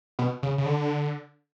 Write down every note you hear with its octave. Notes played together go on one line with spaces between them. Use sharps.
B2
C#3
C#3
D3